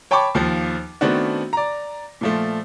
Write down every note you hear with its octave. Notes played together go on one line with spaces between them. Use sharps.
C#5 G5 A5 B5 C#6 D6
D#2 F3
D#3 A3 B3 C4 D4 F#4
D5 A#5
A#2 F3 A3